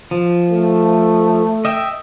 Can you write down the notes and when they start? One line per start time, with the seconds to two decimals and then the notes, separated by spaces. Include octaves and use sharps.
0.11 F3
0.50 A3
1.65 D#5 E5 G5